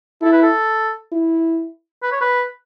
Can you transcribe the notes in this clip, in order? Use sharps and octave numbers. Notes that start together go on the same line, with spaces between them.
E4 A4
B4
A4
E4
B4
C#5
B4